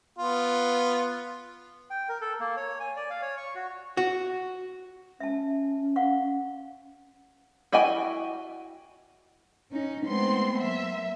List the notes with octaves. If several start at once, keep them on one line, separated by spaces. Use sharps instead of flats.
B3 F4
G5
A#4
A4
A#3
C#5
G#5
D5
F5
C#5
C#6
F#4
F#4
C#4 E5 A5
F5 F#5 C#6
E4 F#4 D#5 G5 G#5
C#4 D#4
G#3 A3 B3 C4 C6
F#3 A#3 E5